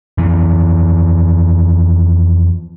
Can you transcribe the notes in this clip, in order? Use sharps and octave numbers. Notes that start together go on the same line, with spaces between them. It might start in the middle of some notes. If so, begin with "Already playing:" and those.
F2 E3